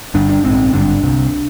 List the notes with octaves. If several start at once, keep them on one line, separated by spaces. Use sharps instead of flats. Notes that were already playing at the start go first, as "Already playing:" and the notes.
G1 G2 D3 D4
D4
A#1 G#2 C4
G#1 G2 D3 D4
C2 C3